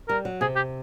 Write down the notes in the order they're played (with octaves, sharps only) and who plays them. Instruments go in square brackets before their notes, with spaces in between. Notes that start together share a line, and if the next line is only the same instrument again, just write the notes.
[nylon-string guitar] G3 [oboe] A#4
[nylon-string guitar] F#3
[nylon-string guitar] C3 [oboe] G#4
[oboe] G4